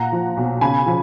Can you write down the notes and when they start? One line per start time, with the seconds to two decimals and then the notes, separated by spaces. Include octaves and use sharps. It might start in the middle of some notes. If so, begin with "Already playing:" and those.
Already playing: A#2 F#5 A#5
0.12 F3
0.37 B1
0.61 C#3 G#5 B5
0.86 F3